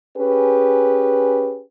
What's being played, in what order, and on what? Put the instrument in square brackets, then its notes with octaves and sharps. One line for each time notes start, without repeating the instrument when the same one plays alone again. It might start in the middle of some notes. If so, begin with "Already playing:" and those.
[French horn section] C#4 G4 G#4 B4